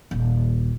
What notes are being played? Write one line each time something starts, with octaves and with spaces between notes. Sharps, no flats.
D#1